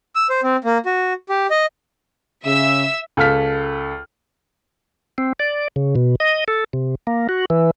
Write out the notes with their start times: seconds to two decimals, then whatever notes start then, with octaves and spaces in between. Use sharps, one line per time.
0.16 E6
0.30 C5
0.43 C4
0.64 A#3
0.86 F#4
1.29 G4
1.51 D#5
2.45 C#3 E5 E6
3.17 C#2 A4 F5 F6 B6
5.18 C4
5.40 D5
5.76 C#3
5.96 B2
6.20 D#5
6.48 A4
6.73 C3
7.07 A#3
7.29 F#4
7.50 E3